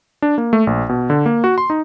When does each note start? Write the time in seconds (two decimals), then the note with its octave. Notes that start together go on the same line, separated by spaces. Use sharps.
0.22 D4
0.38 A#3
0.53 A3
0.67 A#1
0.89 B2
1.10 D3
1.26 A#3
1.44 F#4
1.58 C6
1.70 D#4